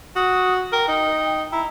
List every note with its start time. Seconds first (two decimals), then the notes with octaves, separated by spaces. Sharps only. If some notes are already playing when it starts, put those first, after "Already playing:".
0.16 F#4 D#6
0.73 A#4 G5
0.88 D#4
1.52 E4 A#5